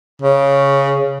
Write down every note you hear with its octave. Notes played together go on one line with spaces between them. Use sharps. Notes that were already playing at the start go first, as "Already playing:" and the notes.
C#3